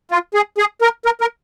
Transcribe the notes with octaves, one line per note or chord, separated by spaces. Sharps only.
F4
G#4
G#4
A#4
A#4
A#4